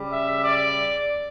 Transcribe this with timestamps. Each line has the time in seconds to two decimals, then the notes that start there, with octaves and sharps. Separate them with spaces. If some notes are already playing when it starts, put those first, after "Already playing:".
Already playing: C#3 G3
0.10 E5
0.41 D5